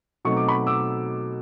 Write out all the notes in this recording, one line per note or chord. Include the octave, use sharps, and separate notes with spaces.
B2 F#3 A3 C4 D#4 C#6
D6
B5 C#6
D6 E6